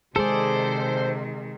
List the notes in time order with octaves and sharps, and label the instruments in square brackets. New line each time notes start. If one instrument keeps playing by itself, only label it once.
[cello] C3 D#3 [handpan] G#3 G#4 [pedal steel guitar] A4 D5 [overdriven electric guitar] C5